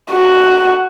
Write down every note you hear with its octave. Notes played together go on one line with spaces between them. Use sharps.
F#4